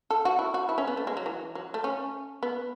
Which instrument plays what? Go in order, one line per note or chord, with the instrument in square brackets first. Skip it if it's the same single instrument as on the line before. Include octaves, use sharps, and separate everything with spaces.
[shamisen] A4
F#4
E4
F#4
E4
C#4
B3
A3
G#3
F#3
E3
F#3
A3
C#4
B3